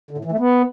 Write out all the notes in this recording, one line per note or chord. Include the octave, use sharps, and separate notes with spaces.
D3
A2
E3
A3
B3